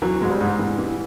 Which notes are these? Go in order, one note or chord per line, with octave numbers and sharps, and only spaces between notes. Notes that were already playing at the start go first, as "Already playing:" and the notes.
E3 F#3
G#2 G#3
G3
G#2
E3
E3